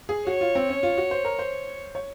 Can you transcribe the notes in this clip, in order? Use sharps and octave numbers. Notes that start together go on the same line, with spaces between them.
G#4
F#4 C#5
F4
C4
C#4
F4
F#4
C5
A#4
C5
C#5